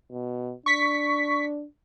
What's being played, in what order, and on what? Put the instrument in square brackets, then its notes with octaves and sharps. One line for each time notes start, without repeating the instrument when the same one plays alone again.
[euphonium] B2
[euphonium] D4 [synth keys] C#6 B6